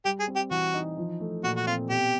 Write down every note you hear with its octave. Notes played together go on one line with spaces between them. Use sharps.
G3 G4
G#4
C4
G4
E3 F#4
D#4
F3
A3
A#2 F#4
F#4
C4 F4
B2 G4